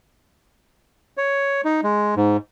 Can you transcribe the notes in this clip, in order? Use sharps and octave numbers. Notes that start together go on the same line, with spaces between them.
C#5
D#4
G#3
G#2